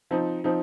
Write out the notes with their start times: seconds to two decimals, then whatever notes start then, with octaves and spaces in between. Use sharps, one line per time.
0.11 F3 C4 D#4
0.44 F3 C4 D#4